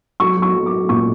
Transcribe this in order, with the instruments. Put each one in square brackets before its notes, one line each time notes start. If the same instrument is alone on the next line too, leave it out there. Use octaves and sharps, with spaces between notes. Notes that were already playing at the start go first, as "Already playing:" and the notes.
[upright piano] F#3 C#6
F#3
C#6
F#3
D6
F#3
A#2 C#6